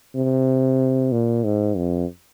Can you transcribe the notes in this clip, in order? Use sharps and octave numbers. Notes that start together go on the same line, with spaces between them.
C3
A#2
G#2
F2